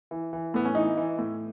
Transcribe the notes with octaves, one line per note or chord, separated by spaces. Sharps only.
E3
E3
A2 B3
C#4
E3 D#4
E3
A2